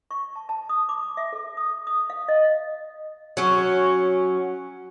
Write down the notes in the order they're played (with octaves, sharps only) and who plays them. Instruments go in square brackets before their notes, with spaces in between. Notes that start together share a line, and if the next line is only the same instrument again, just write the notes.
[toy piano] C#6
A5
A5
D#6
D6
E5
A4
D#6
D#6
F5
D#5
[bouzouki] F#3 C#4